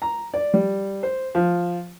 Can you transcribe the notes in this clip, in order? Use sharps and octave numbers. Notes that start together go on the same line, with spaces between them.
A#5
D5
G3
C5
F3